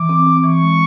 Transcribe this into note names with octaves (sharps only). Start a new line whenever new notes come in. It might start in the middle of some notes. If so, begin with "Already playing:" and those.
Already playing: E3 D6
C4
C4
E3 C#6
G#3